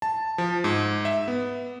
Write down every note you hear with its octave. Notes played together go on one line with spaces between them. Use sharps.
A5
F3
G#2
E5
B3